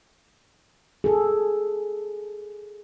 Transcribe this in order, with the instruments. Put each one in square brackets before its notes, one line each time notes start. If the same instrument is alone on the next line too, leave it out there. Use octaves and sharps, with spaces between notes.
[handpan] G#4 A4